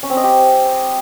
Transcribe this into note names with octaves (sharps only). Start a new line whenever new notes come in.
C#4
C4
D#5
G4